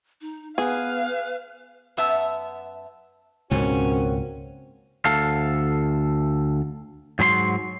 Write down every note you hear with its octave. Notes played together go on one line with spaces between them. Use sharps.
D#4
B3 G#4 B4 F5
F#2 B3 E5 A5
C#2 G#2 B2 A#3 C4 C#4 F#4
D2 A4 F5
G#2 F#3 B5 C6